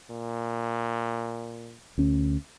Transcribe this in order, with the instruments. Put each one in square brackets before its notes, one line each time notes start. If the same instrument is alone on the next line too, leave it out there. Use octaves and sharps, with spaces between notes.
[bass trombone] A#2
[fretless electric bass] D2 C#4